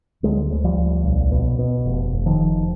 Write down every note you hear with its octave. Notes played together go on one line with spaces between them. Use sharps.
D2 F#3 G#3
D2
F3 G3
D2
B1
B2
B2
F1
F1
D#3 F3
F1